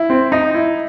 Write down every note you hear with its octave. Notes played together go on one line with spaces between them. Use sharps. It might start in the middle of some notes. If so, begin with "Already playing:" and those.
Already playing: E4
C4
D#4
E4